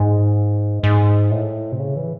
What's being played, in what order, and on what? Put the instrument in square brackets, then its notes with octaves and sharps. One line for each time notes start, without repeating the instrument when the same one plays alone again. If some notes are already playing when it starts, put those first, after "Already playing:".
Already playing: [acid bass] G#2
G#2
A2
C3
C#3
E3